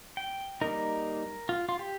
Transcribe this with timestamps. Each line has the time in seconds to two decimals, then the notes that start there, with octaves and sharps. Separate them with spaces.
0.17 G5
0.61 G3 A#3 D#4 A#4
1.49 F4
1.69 F4
1.79 G4